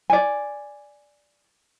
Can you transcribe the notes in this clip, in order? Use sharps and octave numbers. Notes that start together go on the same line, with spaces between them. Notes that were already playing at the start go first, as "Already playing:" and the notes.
D5 G#5